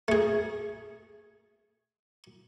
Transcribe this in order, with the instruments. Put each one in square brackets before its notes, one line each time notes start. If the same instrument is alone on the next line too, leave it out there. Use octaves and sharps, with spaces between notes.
[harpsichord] A3 G#4